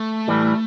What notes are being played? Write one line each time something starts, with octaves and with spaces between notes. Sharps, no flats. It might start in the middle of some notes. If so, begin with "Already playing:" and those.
Already playing: A3
A2 E3 G3